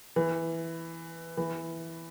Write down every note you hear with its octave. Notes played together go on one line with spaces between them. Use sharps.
E3
E3